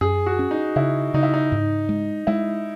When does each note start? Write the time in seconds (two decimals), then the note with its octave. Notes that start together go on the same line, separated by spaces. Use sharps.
0.01 F#2 G#4
0.26 F#4
0.39 C#4
0.51 D#4
0.76 C#3 E4
1.14 C#3 D#4
1.23 E4
1.34 D#4
1.52 G#2
1.89 G#3
2.27 G#3 E4